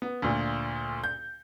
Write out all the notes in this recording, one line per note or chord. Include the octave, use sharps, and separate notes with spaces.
B3
D2 A#2
G6